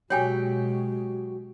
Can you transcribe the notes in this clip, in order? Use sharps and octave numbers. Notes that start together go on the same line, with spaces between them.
B2 F#3 G#3 F#4 G4 C#5 G5 G#5